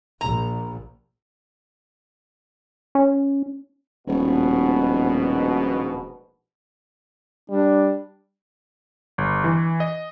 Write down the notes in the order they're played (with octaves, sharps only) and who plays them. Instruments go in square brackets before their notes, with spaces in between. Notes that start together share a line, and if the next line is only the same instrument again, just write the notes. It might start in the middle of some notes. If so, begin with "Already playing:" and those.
[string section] A#1 [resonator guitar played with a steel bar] A#5
[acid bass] C#4
[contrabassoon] D#1 [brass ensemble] A#1 G#2 B2
[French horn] G3 [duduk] D4
[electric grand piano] G1
E3
D#5